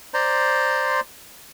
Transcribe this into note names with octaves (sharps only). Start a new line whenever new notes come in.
C5 D5 A#5 C6